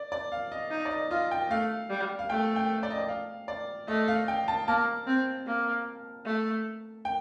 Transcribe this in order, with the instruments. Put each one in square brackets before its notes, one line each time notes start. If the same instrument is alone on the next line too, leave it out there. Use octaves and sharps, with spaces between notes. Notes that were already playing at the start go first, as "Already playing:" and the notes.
Already playing: [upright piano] D5
D5
F5
D#5
[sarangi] D#4
[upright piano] D5
D#5
[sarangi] F4 [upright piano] D#5
[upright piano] G5
[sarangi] A3 [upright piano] F5
[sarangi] G3
[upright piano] F5
[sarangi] A3 [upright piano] G5
[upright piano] G5
D5
D#5
D5
F5
D5
[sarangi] A3 [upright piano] D#5
[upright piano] F5
G5
A5
[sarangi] A#3 [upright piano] A5
[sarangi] C4
A#3
A3
[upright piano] G5